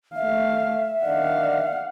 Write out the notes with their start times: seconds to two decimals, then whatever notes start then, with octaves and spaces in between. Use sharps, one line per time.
0.16 A3 E5 F5
1.04 D#3 D4 D5 F5 F#5